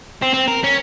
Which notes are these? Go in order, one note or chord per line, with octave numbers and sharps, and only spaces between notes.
C4
C4
A#4
C#4